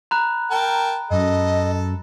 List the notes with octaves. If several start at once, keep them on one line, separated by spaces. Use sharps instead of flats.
A#5 B5 F#6
A#4 G5 A5
F#2 A4 D#5